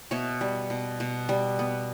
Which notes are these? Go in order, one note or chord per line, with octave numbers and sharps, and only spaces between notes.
B2 C#5 E5
G3
B2
B2
G3
B3